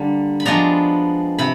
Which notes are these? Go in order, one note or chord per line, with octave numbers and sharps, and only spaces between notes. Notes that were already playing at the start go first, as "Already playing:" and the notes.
Already playing: D3 G3 A#3 D4
B5
F3 G#3 B3 D4 A#5
C3 B5